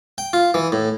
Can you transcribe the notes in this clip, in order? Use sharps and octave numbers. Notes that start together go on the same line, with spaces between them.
G5
F4
E3
A2